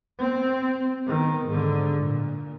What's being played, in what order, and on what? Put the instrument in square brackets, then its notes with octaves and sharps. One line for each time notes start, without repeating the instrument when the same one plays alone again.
[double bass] C4
D#3 B3
G#2 D3
A#2